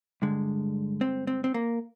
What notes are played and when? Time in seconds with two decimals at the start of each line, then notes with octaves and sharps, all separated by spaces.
0.22 G2 D3 G#3
1.01 C4
1.27 C4
1.44 C4
1.54 A#3